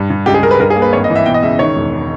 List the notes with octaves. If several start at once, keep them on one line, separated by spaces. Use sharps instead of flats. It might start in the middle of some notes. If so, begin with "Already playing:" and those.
Already playing: G2 G3
G2
C#2 G4
G#4
C#2 A#4
B4
G2 A#4
G#4
A#3
B4
G#1 C#5
D#5
E3
E5
B2 G5
D#5
C#2 E5
D#3 C#5
E1